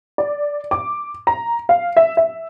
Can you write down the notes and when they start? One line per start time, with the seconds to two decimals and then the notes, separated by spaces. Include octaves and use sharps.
0.18 D5
0.71 D6
1.27 A#5
1.69 F5
1.97 E5
2.17 E5